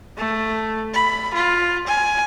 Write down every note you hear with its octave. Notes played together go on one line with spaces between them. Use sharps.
A3
B5
F4
G#5